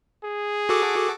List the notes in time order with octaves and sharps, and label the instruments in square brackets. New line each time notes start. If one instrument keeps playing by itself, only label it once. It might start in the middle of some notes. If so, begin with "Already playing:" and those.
[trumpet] G#4
[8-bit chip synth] F#4 A4 D6